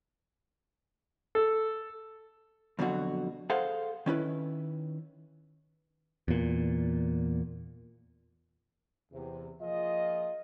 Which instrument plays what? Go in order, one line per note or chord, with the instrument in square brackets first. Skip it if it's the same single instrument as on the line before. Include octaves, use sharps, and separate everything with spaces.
[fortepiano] A4
[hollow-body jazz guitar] F2 B2 D3 F#3 F#4
G#4 A4 C5 F5 F#5
D#3 C#4 E4 B4
[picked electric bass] E2 A#2
[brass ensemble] E2 C3
F3 A#3 F4 G#4 D#5